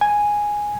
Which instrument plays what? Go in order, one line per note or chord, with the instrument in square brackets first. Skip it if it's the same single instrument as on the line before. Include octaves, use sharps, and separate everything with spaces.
[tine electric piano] G#5